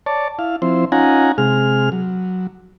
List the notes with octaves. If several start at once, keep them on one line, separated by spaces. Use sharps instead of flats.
C#5 D5 A5
E4 F5
F3 C4 E4 C5
C#4 D#4 F4 F#5 G#5 A#5
C3 G#3 G#4 F6
F#3